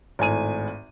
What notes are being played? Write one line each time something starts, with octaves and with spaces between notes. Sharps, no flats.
G#1 A2 G#5 D#7